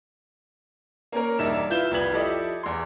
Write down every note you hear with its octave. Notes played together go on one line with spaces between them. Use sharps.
A#3 C#4 A#4
E1 G2 D#4 D5 E5 E7
E4 F4 B4 G6 E7 G7
C2 F2 B4 G#6 F#7
F3 E4 G4 A4 D5 D#5
E2 C6